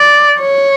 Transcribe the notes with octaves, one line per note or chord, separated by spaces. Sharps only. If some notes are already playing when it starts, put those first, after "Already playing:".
Already playing: D5
C#5